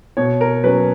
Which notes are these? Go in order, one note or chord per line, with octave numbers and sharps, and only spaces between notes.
B2 C#5
A#4
F#3 C#4 B4